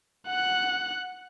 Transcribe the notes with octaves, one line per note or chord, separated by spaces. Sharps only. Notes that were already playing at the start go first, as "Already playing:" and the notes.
F#5 F#6